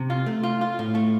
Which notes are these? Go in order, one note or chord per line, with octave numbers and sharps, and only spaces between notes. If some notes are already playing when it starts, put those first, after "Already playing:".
Already playing: C3
F4
A3
F4
F4
A2
A3